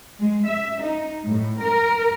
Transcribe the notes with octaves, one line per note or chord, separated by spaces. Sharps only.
G#3
E5
D#4
A2
A#4